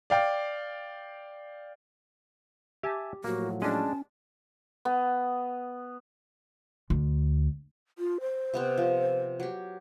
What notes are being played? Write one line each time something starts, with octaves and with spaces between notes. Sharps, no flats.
D5 F5 G5
G4 E5 G#5 A5
A2 F3 F#3 A#3 F#4
G#3 C#4 D4 A5
B3
D2
F4
C5
C3 B3 C4
F3
F#3 G4